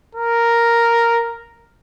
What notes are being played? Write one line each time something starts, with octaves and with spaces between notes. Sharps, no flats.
A#4